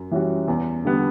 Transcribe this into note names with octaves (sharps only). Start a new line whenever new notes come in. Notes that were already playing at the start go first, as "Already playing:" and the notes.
Already playing: F#2
E3 G3 C#4 F#4
E2
D3 G3 B3